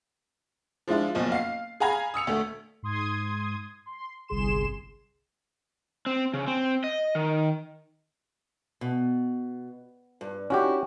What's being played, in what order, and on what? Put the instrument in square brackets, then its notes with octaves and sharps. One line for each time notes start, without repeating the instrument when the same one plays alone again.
[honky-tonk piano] F3 G#3 D4 E4 F4
F#1 B1 F3
F5 C7
G#4 F5 G#5 A#5 B5 G#6
D#6 E6 C#7 F7
D2 A3
[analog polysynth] G#2 C6 D#6 G#6
C6
G1 C2 G#4 C6 E7
[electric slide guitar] C4
C#3
C4
D#5
D#3
[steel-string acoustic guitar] B2
G2
[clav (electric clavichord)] C#4 F#4 G4 [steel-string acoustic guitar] D#4 E4